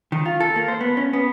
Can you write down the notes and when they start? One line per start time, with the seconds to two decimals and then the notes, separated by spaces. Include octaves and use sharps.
0.12 D#3
0.26 F4
0.40 A4
0.56 A#3
0.68 C5
0.81 B3
0.97 C#4
1.13 B3